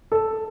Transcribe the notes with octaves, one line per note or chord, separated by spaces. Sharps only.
A4